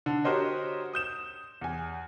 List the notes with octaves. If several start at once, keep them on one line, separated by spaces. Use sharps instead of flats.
D3
F#4 G4 A#4 C5 C#5 D#5
D#6 G6 E7
E2 G#5